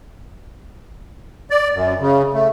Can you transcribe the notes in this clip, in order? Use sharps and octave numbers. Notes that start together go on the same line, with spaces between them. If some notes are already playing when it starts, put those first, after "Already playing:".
D5
F#2
C#3
A3